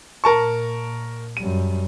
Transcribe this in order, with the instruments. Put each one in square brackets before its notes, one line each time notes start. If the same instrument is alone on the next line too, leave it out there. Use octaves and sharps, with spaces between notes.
[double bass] A#2 [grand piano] A#4 A5 C#6
[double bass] F#2 G3 [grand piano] D#7